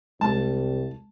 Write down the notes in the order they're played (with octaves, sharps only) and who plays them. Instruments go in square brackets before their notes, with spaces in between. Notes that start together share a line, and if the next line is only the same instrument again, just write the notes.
[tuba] C2 [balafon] G#3 [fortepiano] A5